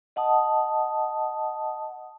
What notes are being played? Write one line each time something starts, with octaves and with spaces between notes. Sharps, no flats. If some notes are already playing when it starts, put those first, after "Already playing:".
D#5 F#5 A5 D#6